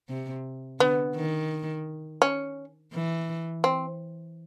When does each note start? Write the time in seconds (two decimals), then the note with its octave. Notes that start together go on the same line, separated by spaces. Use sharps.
0.09 C3
0.80 D3 B3
1.15 D#3
2.22 C#4
2.93 E3
3.64 C4